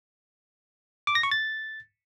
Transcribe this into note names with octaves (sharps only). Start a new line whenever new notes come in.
D6
A#6
C#6
A6